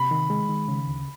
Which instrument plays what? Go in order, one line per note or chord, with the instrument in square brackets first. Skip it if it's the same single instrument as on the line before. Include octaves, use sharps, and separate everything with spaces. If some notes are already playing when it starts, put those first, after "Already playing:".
Already playing: [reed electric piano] C3 [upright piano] B5
[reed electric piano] D#3
G#3
D#3
C#3
D2